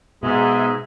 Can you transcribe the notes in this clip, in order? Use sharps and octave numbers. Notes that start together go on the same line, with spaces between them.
G#2 B2 G#3 E5 G#5